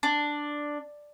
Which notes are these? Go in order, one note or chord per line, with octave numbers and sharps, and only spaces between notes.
D4